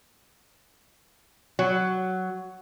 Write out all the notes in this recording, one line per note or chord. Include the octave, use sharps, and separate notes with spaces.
F#3